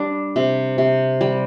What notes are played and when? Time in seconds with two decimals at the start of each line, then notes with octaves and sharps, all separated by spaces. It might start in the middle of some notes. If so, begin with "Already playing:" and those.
Already playing: G3 D4
0.36 C3
0.78 C3
1.21 G3